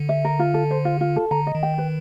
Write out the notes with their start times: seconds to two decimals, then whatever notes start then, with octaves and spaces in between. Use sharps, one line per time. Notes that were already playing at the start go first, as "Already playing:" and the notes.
Already playing: D3
0.09 E5
0.25 A#4
0.39 F4
0.54 A4
0.71 C5
0.85 F4
1.01 F4
1.16 A4
1.31 D3 A#5
1.47 D#5
1.55 D#3
1.63 G5
1.78 B4